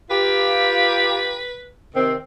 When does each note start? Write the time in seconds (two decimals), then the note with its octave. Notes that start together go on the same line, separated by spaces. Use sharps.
0.10 F4 G4 B4
1.95 C3 D#3 C4